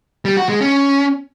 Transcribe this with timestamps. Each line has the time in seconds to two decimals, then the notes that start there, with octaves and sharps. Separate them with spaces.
0.25 G3
0.37 F#4
0.49 G#3
0.61 C#4